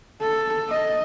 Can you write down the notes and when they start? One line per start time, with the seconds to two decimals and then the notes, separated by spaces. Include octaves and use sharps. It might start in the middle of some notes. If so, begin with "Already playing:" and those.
0.21 A4
0.69 D#5